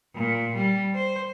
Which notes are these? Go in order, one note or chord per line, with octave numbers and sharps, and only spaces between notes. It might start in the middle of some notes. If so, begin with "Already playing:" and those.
A#2
G3
C5